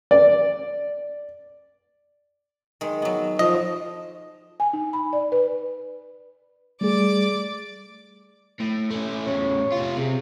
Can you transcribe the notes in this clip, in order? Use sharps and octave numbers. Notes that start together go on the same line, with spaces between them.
D5
D#3 G#3
F#3 B3
F2 F3 D#5
G#5
D#4
B5
D5
B4
G3 A3 G#4 D5 D6
A2
A3 C#4
A2 C#3 C#5
C3 F4
C3 G#4